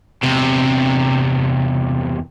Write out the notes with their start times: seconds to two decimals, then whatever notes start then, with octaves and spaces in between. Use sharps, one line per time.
0.23 E2 C3